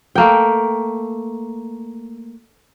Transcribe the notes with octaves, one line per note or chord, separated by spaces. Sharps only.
A3 A#3 G5